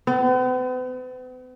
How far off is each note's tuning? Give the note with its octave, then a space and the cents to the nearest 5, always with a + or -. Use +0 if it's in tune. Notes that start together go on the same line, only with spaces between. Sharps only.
B3 +45